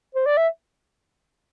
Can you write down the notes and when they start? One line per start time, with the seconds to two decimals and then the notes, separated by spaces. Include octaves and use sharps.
0.15 C5
0.26 D5
0.37 E5